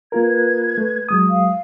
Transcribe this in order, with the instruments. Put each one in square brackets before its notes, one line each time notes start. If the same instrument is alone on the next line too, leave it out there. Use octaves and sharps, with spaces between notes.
[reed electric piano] A#3 F4 A#4 [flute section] B4 G#6
[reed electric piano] A3
F#3 G#3 D#6
[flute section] F5